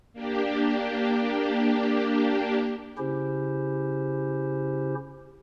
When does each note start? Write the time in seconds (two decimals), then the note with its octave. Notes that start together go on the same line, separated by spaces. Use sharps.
0.13 A#3 D4 G4
2.98 C#3 C#4 E4 G4 C5